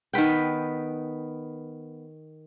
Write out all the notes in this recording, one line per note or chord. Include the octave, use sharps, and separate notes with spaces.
D#3 B3 B4 G5